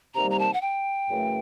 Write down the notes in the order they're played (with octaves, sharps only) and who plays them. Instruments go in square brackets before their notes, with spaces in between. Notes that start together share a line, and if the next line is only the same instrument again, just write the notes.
[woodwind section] C3 D#3 G3 A#3 [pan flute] A#5
[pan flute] A#5
A5
F#5
G5
[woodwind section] F#2 C#3 E3 A3